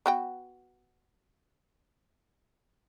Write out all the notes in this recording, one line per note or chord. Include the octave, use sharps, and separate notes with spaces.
B3 F#4 G5